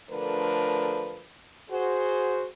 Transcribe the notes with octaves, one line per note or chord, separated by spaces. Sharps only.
D3 F3 A3 D4 A#4 B4
F#4 G#4 C5